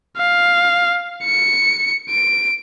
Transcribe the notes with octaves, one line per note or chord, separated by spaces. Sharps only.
F5
C#7
D7